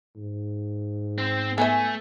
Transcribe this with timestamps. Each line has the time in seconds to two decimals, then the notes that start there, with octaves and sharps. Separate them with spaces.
0.16 G#2
1.18 C4
1.58 A3 B3 C#5 E5 G#5